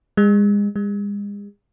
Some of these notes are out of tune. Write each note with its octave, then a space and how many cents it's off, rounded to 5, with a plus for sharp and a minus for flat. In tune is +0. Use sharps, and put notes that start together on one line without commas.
G#3 -30
G#3 -40